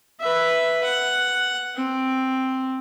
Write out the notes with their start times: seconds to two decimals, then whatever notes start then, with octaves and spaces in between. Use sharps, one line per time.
0.21 B4 E5
0.84 F#5
1.76 C4